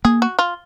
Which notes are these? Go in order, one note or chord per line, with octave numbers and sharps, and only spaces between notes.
A#3 G#4
F#4
F4